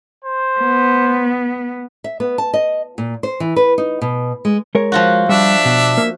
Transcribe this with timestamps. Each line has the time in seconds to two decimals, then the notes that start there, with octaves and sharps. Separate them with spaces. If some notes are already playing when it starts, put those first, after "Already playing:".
0.24 C5
0.60 B3
2.04 E5
2.20 B3
2.38 A5
2.54 D#5
2.98 A#2
3.23 C5
3.40 E3
3.56 B4
3.78 D#4
4.02 B2
4.45 G#3
4.75 G#3 A#4 C#5
4.92 F3 F4 F#4
5.29 G3 D4 E5
5.65 B2
5.98 A#3